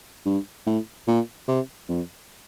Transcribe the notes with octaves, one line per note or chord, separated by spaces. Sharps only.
G2
A2
A#2
C3
F2